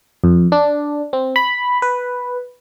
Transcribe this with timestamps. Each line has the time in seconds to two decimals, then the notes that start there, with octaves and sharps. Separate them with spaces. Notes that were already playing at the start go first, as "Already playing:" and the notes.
0.24 F2
0.52 D4
1.13 C4
1.36 B5
1.82 B4